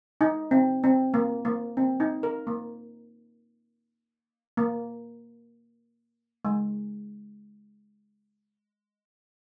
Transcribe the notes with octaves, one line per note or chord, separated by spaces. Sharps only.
D#4
C4
C4
A#3
A#3
C4
D#4
A#4
A#3
A#3
G#3